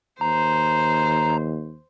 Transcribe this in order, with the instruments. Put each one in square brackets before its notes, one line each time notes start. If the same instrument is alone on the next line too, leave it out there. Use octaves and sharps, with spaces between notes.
[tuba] D#2 [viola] C5 [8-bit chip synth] A#5